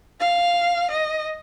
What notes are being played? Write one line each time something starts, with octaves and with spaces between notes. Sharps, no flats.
F5
D#5